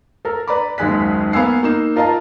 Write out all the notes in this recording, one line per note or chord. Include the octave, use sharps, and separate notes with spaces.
A4 A#4
B4 D5 A#5 B5 D6
F#1 D#2 G#3 G#5 F#6 B6
A#3 B3 F5 G#5 E6 C7
A#3 D#4 E7
F4 A#4 D#5 F5 A5 A#5